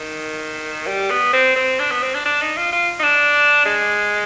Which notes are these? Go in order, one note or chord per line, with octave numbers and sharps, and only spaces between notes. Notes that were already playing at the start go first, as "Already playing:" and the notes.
Already playing: D#3
G3
B3
C4
C4
D4
B3
C4
D4
D4
D#4
F4
F4
D#4
D4
G#3